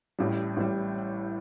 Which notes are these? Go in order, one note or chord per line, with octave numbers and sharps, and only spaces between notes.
A1 A2 G3
A1 A2 G3